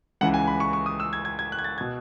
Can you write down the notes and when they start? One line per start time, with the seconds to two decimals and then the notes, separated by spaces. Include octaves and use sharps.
0.21 C#2 C#3 E3 F#5
0.34 G#5
0.47 B5
0.60 C#6
0.73 C#6
0.86 D#6
1.00 E6
1.13 G#6
1.25 G#6
1.39 G#6
1.52 F#6
1.59 G#6
1.64 A6
1.78 G#6
1.81 B2